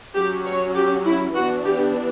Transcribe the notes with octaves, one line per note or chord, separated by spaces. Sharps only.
F#3 C#4 G4
C#5
G4
E4
E3 B3 D4 F#4
G4